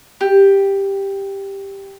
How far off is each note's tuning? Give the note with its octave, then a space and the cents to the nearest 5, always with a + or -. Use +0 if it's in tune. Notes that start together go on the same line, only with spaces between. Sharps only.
G4 +5